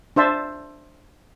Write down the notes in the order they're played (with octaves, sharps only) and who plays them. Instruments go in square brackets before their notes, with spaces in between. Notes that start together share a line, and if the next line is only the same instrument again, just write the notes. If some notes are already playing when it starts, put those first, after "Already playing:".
[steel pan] D4 C5 E5 A5